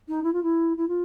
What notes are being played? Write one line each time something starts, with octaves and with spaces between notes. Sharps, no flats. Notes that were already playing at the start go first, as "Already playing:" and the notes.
D#4
E4
F4
E4
E4
F4